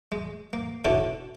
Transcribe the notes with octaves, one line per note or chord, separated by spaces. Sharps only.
G#3
A#3
B2 D3 C#4 D4 E4 A4